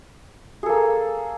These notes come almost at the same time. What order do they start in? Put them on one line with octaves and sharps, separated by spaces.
G#4 A4 A#3